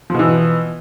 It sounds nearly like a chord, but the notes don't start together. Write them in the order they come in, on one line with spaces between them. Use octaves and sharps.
F3 B2 E3